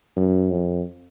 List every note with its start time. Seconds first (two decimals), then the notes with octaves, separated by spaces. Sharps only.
0.17 F#2
0.51 F2